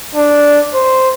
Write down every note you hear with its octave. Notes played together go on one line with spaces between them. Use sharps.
D4
C5